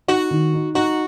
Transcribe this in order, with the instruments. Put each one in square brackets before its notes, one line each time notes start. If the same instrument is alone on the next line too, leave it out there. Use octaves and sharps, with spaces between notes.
[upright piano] D#4 [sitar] F#4
[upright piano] D#3
D#4
[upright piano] D#4 [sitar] F#4